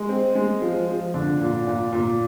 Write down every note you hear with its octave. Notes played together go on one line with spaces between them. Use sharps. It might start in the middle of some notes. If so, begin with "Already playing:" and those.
Already playing: G#3
C4
G#3
F3
F3
D3
A#2
A#2
A#2